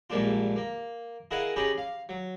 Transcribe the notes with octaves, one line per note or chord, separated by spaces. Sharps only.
A#1 G#2 G3 A#3 D4 F4
A#3
E4 G#4 A#4 D#5 F5 F#5
C#4 D#4 G4 G#4 A#5 B5
F5
F#3